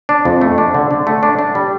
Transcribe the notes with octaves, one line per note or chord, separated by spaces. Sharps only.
D4
F2
A3
D4
D3
D3
A3
D4
D4
G3